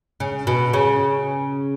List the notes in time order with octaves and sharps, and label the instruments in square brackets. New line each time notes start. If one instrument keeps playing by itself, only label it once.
[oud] C#3
B2
C#3